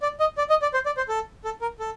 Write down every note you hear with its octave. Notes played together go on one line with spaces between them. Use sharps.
D5
D#5
D5
D#5
D5
C5
D5
C5
A4
A4
A#4
A4